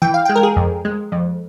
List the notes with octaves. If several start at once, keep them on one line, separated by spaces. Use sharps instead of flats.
E3 G5
F5
G#3 G5
A#4
G#4
F2
G#3
F2